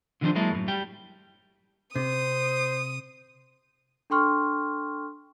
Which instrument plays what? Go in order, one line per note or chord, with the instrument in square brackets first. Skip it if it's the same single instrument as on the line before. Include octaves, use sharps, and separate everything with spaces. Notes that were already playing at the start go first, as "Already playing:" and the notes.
[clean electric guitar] D3 D#3 F3 G3 D4 C5
F#3 G#3 A#3 E4 G#4 A4
F#2 A2
G3 G5
[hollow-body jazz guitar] C3 [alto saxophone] C5 [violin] D#6
[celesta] D4 A4 G5 C6 C#6 F6